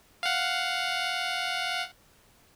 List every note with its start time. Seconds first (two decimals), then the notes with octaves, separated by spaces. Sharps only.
0.23 F5 F#5